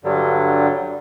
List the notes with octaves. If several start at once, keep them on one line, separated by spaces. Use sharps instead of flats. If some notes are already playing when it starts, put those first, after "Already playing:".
G2 D3 F#3 G3